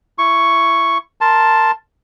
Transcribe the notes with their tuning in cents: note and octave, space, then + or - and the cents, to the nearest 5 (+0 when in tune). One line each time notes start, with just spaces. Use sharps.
E4 +20 C#6 +0
A#4 -10 A5 +0 C6 +0